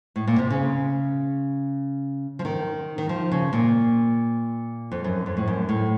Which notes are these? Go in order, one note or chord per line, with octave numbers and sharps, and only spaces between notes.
A2
A#2
C3
C#3
F3
D#3
D#3
F3
C#3
A#2
F2
F#2
F2
A2
F#2
A2